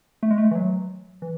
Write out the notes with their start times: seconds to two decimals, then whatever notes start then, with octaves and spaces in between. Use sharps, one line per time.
0.23 A3
0.31 G#3
0.38 A3
0.51 E3
0.55 F#3
1.22 E3